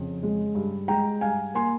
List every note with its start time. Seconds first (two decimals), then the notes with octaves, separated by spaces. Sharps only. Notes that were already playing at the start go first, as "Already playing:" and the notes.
Already playing: F2 C#3
0.23 G#3
0.55 G2
0.88 G#3 G5 A#5
1.21 G2 F5 G#5
1.55 A#3 G#5 C6